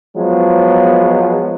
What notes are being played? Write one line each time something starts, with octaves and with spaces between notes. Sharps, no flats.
F3 F#3 G#3 B3